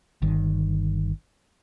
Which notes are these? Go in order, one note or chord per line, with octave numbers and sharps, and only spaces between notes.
G1 D#3